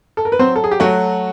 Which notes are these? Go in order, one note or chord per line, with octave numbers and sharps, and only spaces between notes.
A4
A#4
B4
F#3 C4 C5
A4
G#4
G4
F#3 A3 F#4